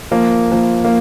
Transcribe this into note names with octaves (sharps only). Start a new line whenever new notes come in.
F3 A#3
F3 A#3
A#3